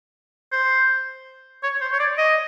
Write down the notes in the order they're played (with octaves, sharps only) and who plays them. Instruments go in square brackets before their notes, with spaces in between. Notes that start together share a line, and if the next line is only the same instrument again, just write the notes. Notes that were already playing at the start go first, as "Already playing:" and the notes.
[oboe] C5
C#5
C5
C#5
D5
D#5